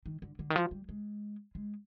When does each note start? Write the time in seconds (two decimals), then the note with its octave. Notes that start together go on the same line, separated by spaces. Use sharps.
0.06 D#3
0.22 D3
0.39 D3
0.50 D#3
0.56 F3
0.71 G3
0.89 G#3
1.55 G#3